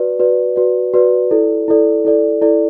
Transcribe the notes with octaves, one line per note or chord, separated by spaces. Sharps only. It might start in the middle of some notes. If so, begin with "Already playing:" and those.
Already playing: F#4 B4 D5
F#4 B4 D5
F#4 B4 D5
F#4 B4 D5
E4 A4 D5
E4 A4 D5
E4 A4 D5
E4 A4 D5